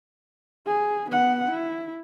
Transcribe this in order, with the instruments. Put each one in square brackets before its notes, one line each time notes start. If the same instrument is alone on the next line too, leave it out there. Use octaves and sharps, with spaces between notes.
[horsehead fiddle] G#4
B3 F#5
E4